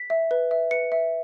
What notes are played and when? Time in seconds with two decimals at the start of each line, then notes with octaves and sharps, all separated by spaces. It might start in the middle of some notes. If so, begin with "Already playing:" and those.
Already playing: B6
0.10 E5
0.31 B4
0.51 E5
0.71 B4 C#7
0.92 E5